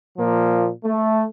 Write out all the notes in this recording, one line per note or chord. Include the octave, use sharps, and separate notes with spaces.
A#2 F3 A#3
A3